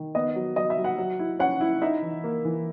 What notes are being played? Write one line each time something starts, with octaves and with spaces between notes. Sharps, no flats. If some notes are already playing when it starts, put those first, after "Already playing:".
Already playing: D#3
B3 D#5
F#3
F#3 D#5
E5
F#3
F#5
F#3
E4
C#4 F#5
E4
D#4 E5
E3
A#3
E3